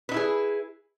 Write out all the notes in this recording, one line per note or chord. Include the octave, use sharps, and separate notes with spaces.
D#4 E4 G#4 B4